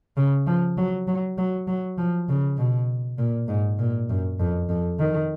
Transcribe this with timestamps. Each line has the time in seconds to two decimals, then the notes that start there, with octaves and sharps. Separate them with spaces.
0.17 C#3
0.47 F3
0.78 F#3
1.08 F#3
1.38 F#3
1.68 F#3
1.98 F3
2.29 C#3
2.58 B2
3.18 A#2
3.48 G#2
3.79 A#2
4.10 F#2
4.39 F2
4.70 F2
4.99 D#3